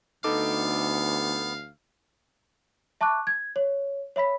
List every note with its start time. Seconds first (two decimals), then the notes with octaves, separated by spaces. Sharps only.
0.24 D2 B3 D#4 A4 F5 D6
3.01 E5 A5 C#6 D6 F#6
3.27 G#6
3.56 C#5
4.16 C#5 E5 B5 B6